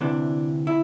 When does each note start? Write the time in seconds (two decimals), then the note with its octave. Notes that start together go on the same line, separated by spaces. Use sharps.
0.01 D2 C3 E3 D4
0.67 E4